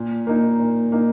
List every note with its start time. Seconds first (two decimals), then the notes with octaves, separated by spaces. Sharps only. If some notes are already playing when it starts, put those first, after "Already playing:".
Already playing: A#2
0.27 A#3 D#4
0.60 A#2
0.92 A#3 D#4